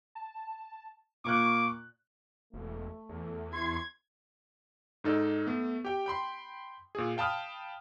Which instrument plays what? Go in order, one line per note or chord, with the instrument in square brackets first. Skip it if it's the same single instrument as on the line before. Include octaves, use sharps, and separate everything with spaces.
[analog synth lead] A5
[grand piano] A#2 A#3 F#6 [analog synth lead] C#6 [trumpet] D6
[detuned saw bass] E1 [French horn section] A3
[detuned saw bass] E2
[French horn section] E4 [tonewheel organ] C6 [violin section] G#6
[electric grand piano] G#2 D#4 A4 D5
A3 B3
G4 G5
G5 B5 C6
A#2 G#4
F5 G5 A5 B5 D#6 F6